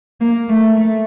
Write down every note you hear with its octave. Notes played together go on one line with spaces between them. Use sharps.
A#3
A3
A3